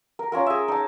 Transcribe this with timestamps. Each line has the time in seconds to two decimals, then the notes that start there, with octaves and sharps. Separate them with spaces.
0.19 A#4
0.32 C#4 F4 A#4
0.46 G#4 E5
0.68 D#4 A5